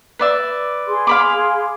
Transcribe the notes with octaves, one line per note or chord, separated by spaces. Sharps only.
B4 D5 E5
G#4 C6
F5 B5 D6